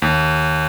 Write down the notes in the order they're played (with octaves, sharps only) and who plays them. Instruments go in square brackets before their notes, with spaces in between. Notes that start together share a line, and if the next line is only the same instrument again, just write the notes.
[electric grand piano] D#2